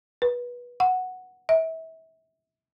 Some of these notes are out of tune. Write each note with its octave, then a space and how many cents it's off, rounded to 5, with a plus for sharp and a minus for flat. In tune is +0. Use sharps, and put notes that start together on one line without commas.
B4 -20
F#5 -5
E5 -30